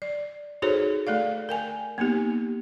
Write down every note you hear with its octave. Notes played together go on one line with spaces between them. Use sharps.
D5
D#4 F#4 G#4 A4 C5 C#5
A3 A4 D5 F5
A#4 G5 G#5
A#3 B3 D#4 G4